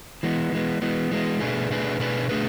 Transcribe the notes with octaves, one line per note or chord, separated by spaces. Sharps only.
E3 G#3 B3
E3 G#3 B3
E3 G#3 B3
E3 G#3 B3
B2 A3 D4 G#4 B4
B2 A3 D4 G#4 B4
B2 A3 D4 G#4 B4
B2 A3 D4 G#4 B4